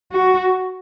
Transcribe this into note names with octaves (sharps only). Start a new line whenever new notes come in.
F#4